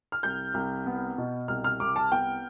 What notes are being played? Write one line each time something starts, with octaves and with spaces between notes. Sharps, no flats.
F6
C2 G6
C2
B3
B2
C2 F6
F6
C2 D6
A5
B3 G5